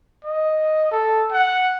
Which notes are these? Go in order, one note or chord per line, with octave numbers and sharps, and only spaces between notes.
D#5
A4
F#5